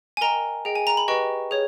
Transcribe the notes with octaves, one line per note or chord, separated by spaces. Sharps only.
G#5
A#4 D#5 G5 A#5
G#4 D#5 G5
G#5
A#5
B5
G4 B4 D#5 G5 C#6
G#4 C#5